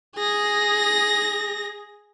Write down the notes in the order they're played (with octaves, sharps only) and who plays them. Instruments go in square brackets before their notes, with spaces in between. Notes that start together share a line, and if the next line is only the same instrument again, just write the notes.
[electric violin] G#4 A#6